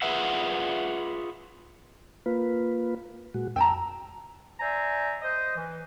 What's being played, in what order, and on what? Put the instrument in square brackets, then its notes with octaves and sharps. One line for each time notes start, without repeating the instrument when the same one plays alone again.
[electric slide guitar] F4 G#4 B4 E5 F#5
[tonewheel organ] A#3 F4 B4
A#2 G#3 F#4
[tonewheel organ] F2 E6 [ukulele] G5 A5 A#5
[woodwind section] C5 D5 E5 G#5 A#5
C5 D#5
E3